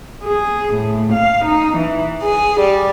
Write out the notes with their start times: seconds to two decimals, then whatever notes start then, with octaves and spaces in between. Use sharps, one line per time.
0.23 G#4
0.74 A2
1.12 F5
1.45 D#4
1.77 E3
2.21 G#4
2.59 G3